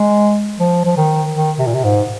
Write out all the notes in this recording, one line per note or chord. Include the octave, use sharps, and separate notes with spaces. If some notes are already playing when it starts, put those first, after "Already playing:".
Already playing: G#3
F3
F3
D#3
D#3
C3
A#2
C3
G#2